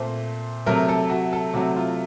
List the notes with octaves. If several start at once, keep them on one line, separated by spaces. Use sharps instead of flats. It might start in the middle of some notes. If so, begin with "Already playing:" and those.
Already playing: A#2 A3 C4 C5
C3 F#3 A3 A#4
A4
F#4
A4
C3 F#3 A3 F#4
F4